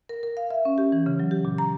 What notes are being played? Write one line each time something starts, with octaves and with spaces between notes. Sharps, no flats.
A#4
A#4
F5
E5
C#4
G4
E3
C#3
F#3
G4
A#2
A#5